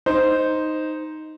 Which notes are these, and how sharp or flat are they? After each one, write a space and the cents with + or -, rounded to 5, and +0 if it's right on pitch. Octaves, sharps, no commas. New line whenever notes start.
D#4 +0 C5 -5